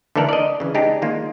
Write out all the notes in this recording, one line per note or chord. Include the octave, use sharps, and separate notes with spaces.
D3 E3 A3 A4 A#4 D5
D5 D#5
C#3 E3
G#3 D4 D#4 G4
D#3 G#3 A#3 F4